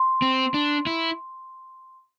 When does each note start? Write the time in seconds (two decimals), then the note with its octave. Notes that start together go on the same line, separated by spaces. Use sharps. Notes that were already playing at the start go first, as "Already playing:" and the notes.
Already playing: C6
0.22 C4
0.54 D4
0.86 E4